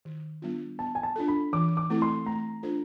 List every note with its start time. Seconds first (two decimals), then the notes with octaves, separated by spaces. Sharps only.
0.05 D#3
0.42 G3 B3 D4 F4
0.79 B3 A5
0.95 G#5
1.03 A5
1.16 D4 F4 A4
1.28 B5
1.53 E3 D6
1.77 D6
1.90 A3 C4 E4 A4
2.02 C6
2.26 A3 A#5
2.63 D4 F4 A4 C5